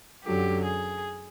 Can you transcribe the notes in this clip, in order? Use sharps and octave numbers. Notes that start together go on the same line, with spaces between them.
F#2 D3 F#3 G4
G#4